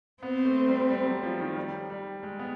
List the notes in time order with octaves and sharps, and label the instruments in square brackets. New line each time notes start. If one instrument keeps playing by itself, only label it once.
[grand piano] B3 [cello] C4
[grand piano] A3
G3
G3
F#3
F3
D#3
G3
G3
G#3
B3